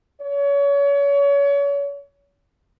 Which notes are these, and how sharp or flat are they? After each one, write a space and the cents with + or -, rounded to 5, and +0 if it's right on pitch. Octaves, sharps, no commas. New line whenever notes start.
C#5 +30